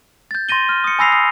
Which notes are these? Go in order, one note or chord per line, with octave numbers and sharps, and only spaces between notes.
G6 A6
C6 A6 A#6 D#7 G7
F6
D#6 C#7
G#5 B5 E6 A#6 C7 F7
D#6 C7